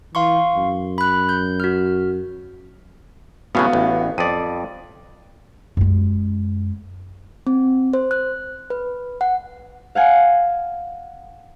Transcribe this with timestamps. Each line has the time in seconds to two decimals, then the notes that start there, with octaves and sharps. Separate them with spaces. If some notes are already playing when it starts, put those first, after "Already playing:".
0.15 E3 F5 C6 C#6
0.55 F#2
0.98 B5 F#6
1.29 G6
1.60 F#4 F6
3.55 A2 C#3 F#3 B3 F#4 F5
3.73 A1
4.18 F2 D5 D#6 D#7
5.77 F#2 G#3
7.47 C4
7.93 C5
8.11 F#6
8.70 B4
9.21 F#5
9.95 F5 F#5 G#5